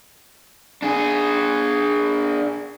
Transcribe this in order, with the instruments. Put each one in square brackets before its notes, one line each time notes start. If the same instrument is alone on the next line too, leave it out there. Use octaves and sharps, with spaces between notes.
[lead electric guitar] D4 G#4